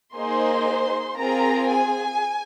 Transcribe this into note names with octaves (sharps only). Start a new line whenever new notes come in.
A#3 D#4 G#4 C5 C6
C4 F4 G#4 A#4 A#5
G#4 G#5